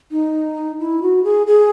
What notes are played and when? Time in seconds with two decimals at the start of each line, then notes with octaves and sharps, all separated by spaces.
0.11 D#4
0.80 E4
1.02 F#4
1.24 G#4
1.47 G#4